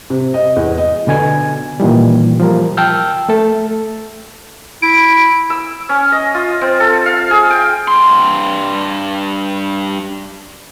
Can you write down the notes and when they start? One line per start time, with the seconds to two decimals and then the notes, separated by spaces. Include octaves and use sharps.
0.10 C3
0.34 D#5
0.56 E2
0.77 D#5
1.07 B2 D3 G#5 G#6
1.80 A#2 D#3 E3 G3
2.40 F3 G3 A#4
2.77 G5 A5 E6 F6 G6
3.29 A3 A4
4.82 E4 D7
5.50 E6
5.89 C#4
6.12 D#5
6.34 F4
6.61 C4
6.80 A4
7.06 F5
7.31 G#4
7.50 G5
7.88 G2 C6